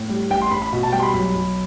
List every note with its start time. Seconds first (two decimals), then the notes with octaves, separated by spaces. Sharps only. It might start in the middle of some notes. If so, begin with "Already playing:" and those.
Already playing: A2
0.09 G3
0.31 A1 G5
0.42 C6
0.51 A1 B5
0.62 B5
0.73 B2
0.83 A5
0.93 G3 G5
1.00 C6
1.03 B5
1.14 B1 B5
1.35 B1